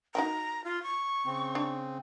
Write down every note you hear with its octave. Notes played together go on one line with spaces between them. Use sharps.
D#4 F#4 G5 A#5
F4
C#6
C#3 C4
D4